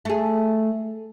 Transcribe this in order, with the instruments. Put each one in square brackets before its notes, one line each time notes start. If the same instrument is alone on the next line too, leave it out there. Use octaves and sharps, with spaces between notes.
[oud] A3 G#4